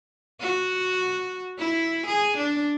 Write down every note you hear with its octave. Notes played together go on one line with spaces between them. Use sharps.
F#4
E4
G#4
D4